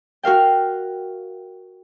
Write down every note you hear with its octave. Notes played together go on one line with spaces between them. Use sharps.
F#4 A#4 F5 G5